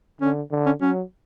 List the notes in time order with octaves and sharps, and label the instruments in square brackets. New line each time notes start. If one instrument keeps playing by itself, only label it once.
[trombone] D3 [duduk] C#4
[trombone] D3
[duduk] C#4
[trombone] F#3 [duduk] C#4